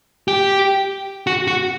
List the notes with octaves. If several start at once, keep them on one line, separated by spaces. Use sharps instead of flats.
G4
F#4
F#4